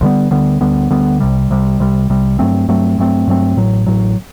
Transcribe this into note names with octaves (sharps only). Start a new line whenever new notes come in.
D2 D3 G3 B3
D2 D3 G3 B3
D2 D3 G3 B3
D2 D3 G3 B3
C2 C3 G3
C2 C3 G3
C2 C3 G3
C2 C3 G3
G2 F#3 A3 C4
G2 F#3 A3 C4
G2 F#3 A3 C4
G2 F#3 A3 C4
A1 A2 F#3
A1 A2 F#3